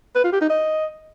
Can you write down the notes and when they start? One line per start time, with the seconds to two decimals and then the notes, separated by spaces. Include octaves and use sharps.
0.15 B4
0.24 F4
0.33 G4
0.41 D#4
0.50 D#5